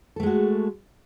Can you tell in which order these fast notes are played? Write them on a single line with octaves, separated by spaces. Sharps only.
A4 A3 G#3 F#4